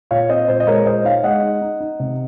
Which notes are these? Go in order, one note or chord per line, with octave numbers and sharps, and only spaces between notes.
A#2 C#5 F5
C4 C5 D#5
A#2 C5
D#5
G#3 A#4 C#5
A#2 C5 D#5
D#4 C#5 F5
G#3 D#5 F#5
D#4
D#4
D#4
C3